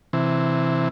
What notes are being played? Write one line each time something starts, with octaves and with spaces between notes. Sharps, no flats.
C3 E3